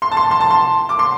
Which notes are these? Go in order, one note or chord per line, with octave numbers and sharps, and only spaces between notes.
C6
A5
C6
C6
A5
C6
D6
C6